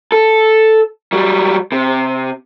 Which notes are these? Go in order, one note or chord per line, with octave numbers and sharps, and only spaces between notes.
A4
F#3 G3
C3